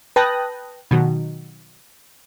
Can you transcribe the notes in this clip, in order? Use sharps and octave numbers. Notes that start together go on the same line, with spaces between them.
B4 G5 A5 D#6 F#6 A#6
B2 D#3 F#3